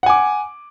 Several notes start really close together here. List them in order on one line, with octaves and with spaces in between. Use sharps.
F#5 G#5 D6